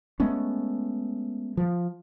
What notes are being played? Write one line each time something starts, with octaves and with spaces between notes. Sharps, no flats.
G#3 A3 B3 C#4
F3